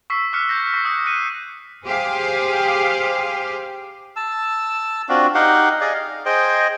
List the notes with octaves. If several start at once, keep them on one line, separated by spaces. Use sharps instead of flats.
C#6 E6 B6 C7
D6 F6 F#6 B6 C#7
G6 A#6
C#6 A#6 C7
D#6 F#6 G6 C#7
F#6 C#7 D#7
G4 G#4 C5 F5
A5 E6
C4 D4 F4 F#4
D#4 G4 F5 F#5
G#4 D5 D#5 F5
F5
G#4 C5 D#5 G5